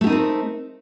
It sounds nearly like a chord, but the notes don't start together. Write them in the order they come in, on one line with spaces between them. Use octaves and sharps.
A3 G4 D#4 A#4 C4